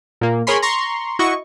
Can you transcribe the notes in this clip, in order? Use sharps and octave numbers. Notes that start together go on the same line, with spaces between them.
A#2 A#3
G#4 A#4 C#5 G#5 B5 C6
A#5 C6 C#6
E4 F#4 D#5 C#6